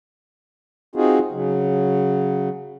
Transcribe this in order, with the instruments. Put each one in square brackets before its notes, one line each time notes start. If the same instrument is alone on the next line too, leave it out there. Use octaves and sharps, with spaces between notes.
[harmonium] C4 D#4 F4 F#4 G#4
C#3 F#3